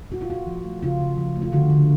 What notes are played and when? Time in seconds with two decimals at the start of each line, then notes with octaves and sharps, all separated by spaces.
0.12 A#2 F#4
0.21 F4
0.29 A#2 F#4
0.47 F3
0.65 A3
0.83 C#3 F4
1.00 C#3
1.17 F3
1.35 A3
1.42 F4
1.52 D3 F#4
1.70 D3